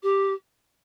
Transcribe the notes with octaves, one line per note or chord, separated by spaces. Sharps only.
G4